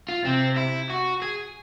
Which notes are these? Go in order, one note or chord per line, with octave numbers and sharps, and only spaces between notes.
F4
C3 C4
E4
F#4
G#4